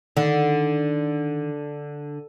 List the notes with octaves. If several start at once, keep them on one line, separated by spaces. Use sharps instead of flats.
D3 D#3